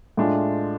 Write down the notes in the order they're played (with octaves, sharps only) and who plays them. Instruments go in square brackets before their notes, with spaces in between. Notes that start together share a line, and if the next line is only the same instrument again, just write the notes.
[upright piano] A2 G#3 D4 F4